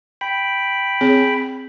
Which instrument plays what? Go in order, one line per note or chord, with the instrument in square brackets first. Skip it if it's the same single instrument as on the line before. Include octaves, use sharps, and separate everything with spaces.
[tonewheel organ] G5 B5
[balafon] C4 G#4 C#5